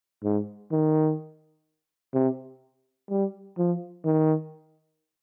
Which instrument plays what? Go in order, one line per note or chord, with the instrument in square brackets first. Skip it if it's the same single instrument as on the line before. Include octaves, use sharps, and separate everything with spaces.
[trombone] G#2
D#3
C3
G3
F3
D#3